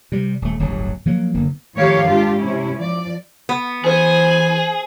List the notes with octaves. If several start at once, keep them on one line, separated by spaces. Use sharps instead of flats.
C3 G3
D#1 A3
D1 G1 G2 F#3
F3 F#3 A#3
F#1 D3 A#3 B3
A2 D#3 F3 G4 C#5 F5
G#2 D4 F4 G4
C3 C#4 E4
F3 D5
B3
E3 G#4 C5 G#5